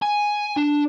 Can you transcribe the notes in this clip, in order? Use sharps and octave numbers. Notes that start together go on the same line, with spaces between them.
G#5
D4